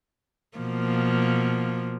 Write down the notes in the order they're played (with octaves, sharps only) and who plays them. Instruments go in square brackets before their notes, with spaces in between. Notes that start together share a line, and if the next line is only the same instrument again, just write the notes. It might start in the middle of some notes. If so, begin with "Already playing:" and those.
[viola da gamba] B2 F3 A#3